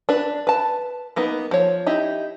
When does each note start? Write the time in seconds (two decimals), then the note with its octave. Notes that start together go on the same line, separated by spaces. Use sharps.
0.09 D4 B4
0.47 B4 A5
1.16 A#3 B3 D#4 B4
1.51 F3 C#5
1.87 D#4 E4 G4